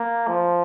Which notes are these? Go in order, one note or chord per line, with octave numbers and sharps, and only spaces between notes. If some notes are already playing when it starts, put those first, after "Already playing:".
Already playing: A#3
F3